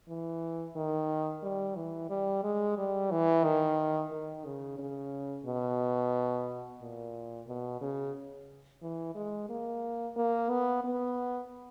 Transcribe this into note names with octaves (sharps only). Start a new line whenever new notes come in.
E3
D#3
G3
E3
G3
G#3
G3
E3
D#3
D#3
C#3
C#3
B2
A#2
B2
C#3
E3
G#3
A#3
A#3
B3
B3